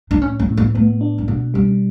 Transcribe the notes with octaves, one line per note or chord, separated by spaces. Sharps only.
D4
A2 C#4
C#4
A2
B3
A3 B3
D4
C#4
B2 B3
G3 C#4